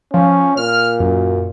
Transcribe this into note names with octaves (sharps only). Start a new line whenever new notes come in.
F3 C#4
A#2 F6
F#2